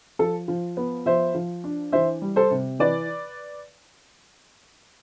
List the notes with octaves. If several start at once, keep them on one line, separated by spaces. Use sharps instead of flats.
F3 A4
F3
B3
F3 C5 E5
F3
D4
E3 C5 E5
G3
A4 C5
C3
E3 B4 D5